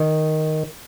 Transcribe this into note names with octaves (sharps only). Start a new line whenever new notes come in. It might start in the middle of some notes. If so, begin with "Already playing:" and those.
Already playing: D#3